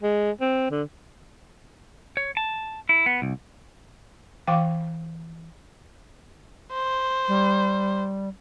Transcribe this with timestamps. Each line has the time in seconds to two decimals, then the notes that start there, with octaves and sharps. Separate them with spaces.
0.03 G#3
0.41 C4
0.71 D3
2.17 C#5
2.37 A5
2.89 E4
3.06 B3
3.22 C2
4.47 E3 F5 G5 D6
6.73 C5
7.28 G3